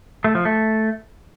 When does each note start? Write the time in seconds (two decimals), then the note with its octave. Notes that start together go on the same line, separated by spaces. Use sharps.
0.24 A3
0.35 F3
0.45 A3